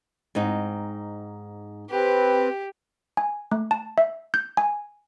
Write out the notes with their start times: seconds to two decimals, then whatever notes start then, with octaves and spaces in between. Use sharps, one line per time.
0.35 G#2 C4 D#4
1.90 C4 G4 B4
3.17 G#5
3.51 A3
3.71 A5
3.98 E5
4.34 G6
4.57 G#5